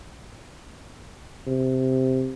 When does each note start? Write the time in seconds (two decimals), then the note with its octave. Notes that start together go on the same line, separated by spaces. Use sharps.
1.47 C3